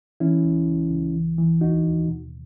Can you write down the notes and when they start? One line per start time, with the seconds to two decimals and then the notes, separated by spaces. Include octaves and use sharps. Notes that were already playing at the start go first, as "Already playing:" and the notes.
0.20 E3 C#4 E4
0.45 C#2
0.67 C#2
0.91 C#2
1.14 E3
1.38 E3
1.61 D#2 D#4 F#4
1.84 D#2
2.08 B2